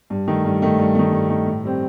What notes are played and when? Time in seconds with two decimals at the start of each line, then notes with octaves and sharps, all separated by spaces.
0.10 G2
0.28 D#3 A3
0.45 G2
0.62 D#3 A3
0.79 G2
0.95 D#3 A3
1.12 G2
1.29 D#3 A3
1.46 A2
1.64 G3 C4